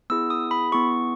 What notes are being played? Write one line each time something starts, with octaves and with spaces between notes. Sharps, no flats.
B3 E4 G#4 E6
D#6
B5
B3 E4 G#4 C#6